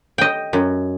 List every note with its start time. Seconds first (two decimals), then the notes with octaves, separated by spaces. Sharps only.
0.18 D#5 G5
0.53 F#2